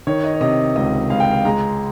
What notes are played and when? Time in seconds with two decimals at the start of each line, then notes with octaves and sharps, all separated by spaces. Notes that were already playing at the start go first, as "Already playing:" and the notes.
0.07 D#3 C#5
0.24 D#5
0.34 C#5
0.40 C3 D#5
0.76 C#2 D#5
1.10 C#2 F5
1.20 G5
1.31 F5
1.45 G#3 A#5